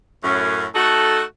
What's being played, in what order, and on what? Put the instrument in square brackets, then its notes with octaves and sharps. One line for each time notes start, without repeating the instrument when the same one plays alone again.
[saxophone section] F#2 A2 [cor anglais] C#4
[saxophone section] A3 D#4 F#4 [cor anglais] A4